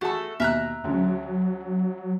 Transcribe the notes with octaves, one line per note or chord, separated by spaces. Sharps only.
A3 F#4 G#4 A4 A5
D#2 B2 E5 A#5 F6 F#6
D2 C#3 F#3